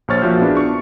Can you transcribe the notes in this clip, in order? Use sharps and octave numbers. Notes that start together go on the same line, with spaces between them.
A#1 C5 C#5 C#6 F6 A6
A#2 F3 F#4 E5 G6
B3 D4 E4 G#4 B4
C#6 C#7